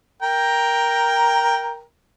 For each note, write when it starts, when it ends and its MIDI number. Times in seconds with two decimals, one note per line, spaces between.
0.22 1.82 70
0.22 1.82 79
0.22 1.82 82